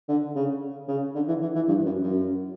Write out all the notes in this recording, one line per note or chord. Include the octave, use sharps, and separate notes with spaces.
D3
C#3
C#3
D3
E3
E3
E3
G2
F#2
F#2